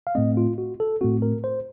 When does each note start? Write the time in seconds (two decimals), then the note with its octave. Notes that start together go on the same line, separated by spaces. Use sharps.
0.07 F5
0.15 A2 A3 C4 D#5
0.37 F4
0.58 F#4
0.80 A4
1.01 A2 A3 C4 F#4
1.22 A#4
1.44 C5